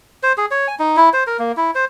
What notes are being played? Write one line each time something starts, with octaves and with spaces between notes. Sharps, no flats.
C5
G#4
C#5
G#5
D#4
E4
C5
A#4
A#3
E4
C5